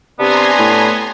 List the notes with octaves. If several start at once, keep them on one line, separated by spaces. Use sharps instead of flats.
C3 B3 D4 G#5 A#5 C6
A2